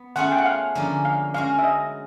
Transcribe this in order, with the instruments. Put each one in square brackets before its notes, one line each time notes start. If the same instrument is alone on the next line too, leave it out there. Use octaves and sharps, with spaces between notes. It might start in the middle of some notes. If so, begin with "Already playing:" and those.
Already playing: [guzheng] B3
[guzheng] A3 C#4 F4 G#4 [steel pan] F#5
[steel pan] G5
F#5
F5
[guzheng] D3 F3 A#3 C#4
[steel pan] F5
[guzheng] G#3 C#4 F#4 [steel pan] F5
[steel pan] E5
D#5